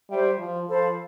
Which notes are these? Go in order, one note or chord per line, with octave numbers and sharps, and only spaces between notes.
G3 C5 E5 G5
F3
F3 A4 C5 F5 B5